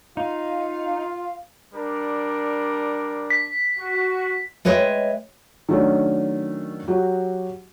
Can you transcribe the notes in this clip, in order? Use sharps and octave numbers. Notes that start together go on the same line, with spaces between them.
D#4 F4 F5
G3 D4 A#4
B6
F#4
G#3 B4 C#5 D#5 E5 G5
D#3 F#3 A3 C#4 D4
F#3 F#4 G4